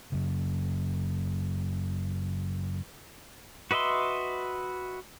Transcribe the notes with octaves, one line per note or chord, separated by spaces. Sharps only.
F#2 C#3
F#4 B4 D#5 E5 C6